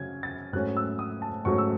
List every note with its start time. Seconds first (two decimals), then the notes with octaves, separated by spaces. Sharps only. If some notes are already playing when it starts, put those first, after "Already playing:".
Already playing: C#3 F#3 C#4 G#6
0.23 A6
0.53 G#2 F#3 A3 C#4 F#6
0.77 E6
0.99 D#6
1.22 A5
1.45 G#2 F#3 A3 C#4 C#6
1.58 E6